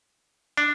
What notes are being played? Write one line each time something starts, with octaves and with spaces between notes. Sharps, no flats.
D4